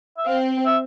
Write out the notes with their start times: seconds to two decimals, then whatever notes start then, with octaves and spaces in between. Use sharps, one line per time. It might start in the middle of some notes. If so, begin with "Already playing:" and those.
0.18 E5
0.27 C4 F5
0.66 E5